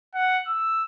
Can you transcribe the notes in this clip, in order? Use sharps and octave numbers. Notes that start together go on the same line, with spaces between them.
F#5
E6